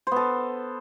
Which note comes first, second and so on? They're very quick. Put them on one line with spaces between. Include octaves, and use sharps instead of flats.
C5 B3 A4